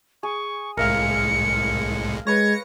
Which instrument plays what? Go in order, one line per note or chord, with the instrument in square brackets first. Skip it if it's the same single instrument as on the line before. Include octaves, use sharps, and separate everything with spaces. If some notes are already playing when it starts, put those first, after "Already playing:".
[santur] G#4 [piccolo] C#6
[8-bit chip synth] C2 A2 G#3 [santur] A#4 E5 F5 [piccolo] C#7
[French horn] G#3 [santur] B4 C#5 [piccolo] G#6 [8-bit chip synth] A#6 C#7